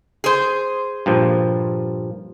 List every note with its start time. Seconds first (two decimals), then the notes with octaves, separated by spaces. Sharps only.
0.24 G#4 C5
1.06 G2 A#2 F3